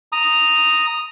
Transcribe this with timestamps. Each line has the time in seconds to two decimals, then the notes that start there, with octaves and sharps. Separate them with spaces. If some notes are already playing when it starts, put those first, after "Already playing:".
0.12 A#5 D#6